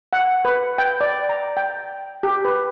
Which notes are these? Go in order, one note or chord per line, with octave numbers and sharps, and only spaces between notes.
F#5
B4
G5
D5
A#5
G5
G4
B4